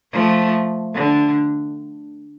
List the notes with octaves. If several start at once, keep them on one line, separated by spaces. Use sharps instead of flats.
F3 A3
D3